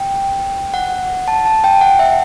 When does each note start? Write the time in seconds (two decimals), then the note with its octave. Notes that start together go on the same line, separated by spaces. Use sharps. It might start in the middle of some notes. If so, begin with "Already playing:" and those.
Already playing: G5
0.74 F#5
1.28 A5
1.46 A5
1.64 G5
1.81 F#5
1.99 E5